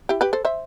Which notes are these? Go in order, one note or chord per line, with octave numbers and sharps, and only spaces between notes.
E4 G4
G4 B4
A4 C5
C5 E5